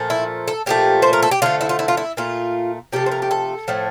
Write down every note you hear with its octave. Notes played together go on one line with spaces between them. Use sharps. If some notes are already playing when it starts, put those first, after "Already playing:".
Already playing: A#2 F3 A3
E4
A4
A#2 F3 A3 G4
C5
A#4
A4
G4
D3 F3 A3 F4
E4
F4
E4
F4
E4
A#2 A3 F4
C3 F3 A3 G4
C5
A#4
G4
A4
A2 F3 A3